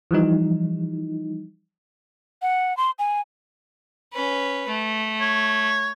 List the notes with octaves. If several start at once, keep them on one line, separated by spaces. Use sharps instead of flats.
E3 F3 G3 D#4
F#5
C6
G#5
C#4 B4
A3
C#5